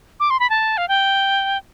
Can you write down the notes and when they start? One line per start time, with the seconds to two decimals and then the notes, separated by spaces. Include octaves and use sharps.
0.20 D6
0.30 C6
0.40 B5
0.50 A5
0.78 F5
0.88 G5